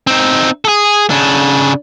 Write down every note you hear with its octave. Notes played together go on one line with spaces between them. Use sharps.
C4 D#4
G#4 A4
C#3 D4